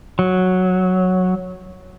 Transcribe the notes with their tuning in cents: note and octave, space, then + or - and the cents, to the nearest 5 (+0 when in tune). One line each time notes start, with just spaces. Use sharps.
F#3 -5